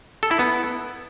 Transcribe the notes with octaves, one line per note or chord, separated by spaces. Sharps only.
A4
E4
B3